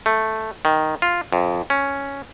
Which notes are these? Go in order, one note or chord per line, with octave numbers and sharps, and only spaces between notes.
A3
D#3
F4
F2
C#4